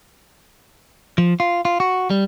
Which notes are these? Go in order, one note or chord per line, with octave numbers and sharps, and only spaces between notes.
F3
F4
F4
F#4
G3